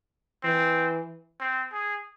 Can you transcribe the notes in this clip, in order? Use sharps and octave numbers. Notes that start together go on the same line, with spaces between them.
E3 C4
C4
G#4